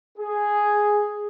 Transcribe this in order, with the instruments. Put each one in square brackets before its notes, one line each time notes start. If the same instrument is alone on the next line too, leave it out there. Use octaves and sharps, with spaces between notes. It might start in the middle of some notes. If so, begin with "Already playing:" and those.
[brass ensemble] G#4